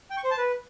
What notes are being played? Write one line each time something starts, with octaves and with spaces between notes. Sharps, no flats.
G5
C#6
C5
A5
B4